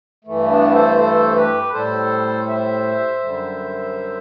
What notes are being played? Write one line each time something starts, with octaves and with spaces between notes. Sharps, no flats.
G2 E3 A3
B3 D4
A4 C5
A4 C5
G4 B4
A2 G3 A4 C5
C5 E5
F#2 D3 G3